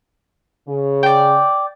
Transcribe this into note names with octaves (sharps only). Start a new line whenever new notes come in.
C#3
D5 G5